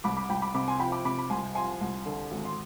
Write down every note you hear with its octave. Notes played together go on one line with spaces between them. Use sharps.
C2 B5 D6
B5 D6
C2 G5 B5
B5 D6
C3 B5 D6
G#5 C6
F3 G5 B5
B5 D6
C3 B5 D6
B5
C2 G#5 C6
F3 G#5 C6
C2
D3
G#1
C6